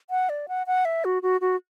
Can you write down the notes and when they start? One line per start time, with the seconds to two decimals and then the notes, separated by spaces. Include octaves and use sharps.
0.10 F#5
0.29 D5
0.48 F#5
0.67 F#5
0.85 E5
1.05 F#4
1.23 F#4
1.41 F#4